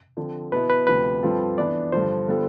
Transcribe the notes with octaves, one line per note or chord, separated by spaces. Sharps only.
D3 F3 C4
B2 B3 E4 B4
B4
D2 C3 F3 B4
G2 F3 C4 F4 A4
E3 B3 D4 D5
G2 D3 F3 C5
D3 G3 B3 F4 A4